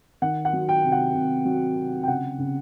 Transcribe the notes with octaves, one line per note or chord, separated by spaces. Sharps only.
D#3 F#5
F#5
F#3
G5
C3
F#5
C3
F#3
C3
G5
C#3 F#5
C#3